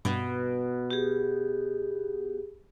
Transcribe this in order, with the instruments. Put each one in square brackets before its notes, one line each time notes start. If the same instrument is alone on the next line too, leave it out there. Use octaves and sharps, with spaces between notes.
[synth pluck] G2 [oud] B2
[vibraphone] G4 G#4